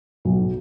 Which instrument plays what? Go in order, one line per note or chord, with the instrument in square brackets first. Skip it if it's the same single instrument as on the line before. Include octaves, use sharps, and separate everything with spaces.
[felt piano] B1